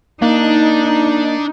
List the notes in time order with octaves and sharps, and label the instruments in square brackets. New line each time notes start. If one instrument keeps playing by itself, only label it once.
[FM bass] A#3 [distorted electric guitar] D4 [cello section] D#4